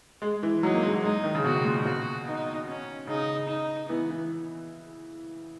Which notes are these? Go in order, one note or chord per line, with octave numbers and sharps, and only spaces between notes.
G#3
E3
F#3 D#4
A#3
G#3
F#3
G#3 D#4
D#3
C#3
B2 F#4
A#2
B2 F#4
D#4
C#4
C#3 D#4
D#4
E3 B3
E3